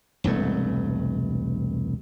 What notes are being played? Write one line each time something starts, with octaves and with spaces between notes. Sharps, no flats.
E1 C2 G2 A3